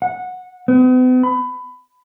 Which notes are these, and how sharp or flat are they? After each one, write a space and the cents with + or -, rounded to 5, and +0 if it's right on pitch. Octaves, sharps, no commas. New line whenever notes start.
F#5 -15
B3 +45
B5 +20